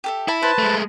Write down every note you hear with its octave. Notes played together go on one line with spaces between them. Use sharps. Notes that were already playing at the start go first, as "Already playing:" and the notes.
G4 A4 E5
E4 A5 B5
B4 C5 A5
G#3 A3